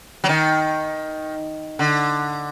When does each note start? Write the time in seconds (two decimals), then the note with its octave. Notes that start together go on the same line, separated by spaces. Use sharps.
0.24 F#3
0.29 D#3
1.79 D3